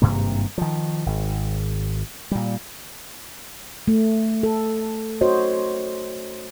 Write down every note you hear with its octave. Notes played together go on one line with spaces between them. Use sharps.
G#1 G2 C3 A#3
D#3 F3
G#1
A#2 G3
A3
A4
F#4 C5 C#5 D#5